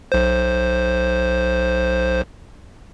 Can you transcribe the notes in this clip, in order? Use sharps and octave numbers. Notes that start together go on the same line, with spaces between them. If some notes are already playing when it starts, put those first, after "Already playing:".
B1 C5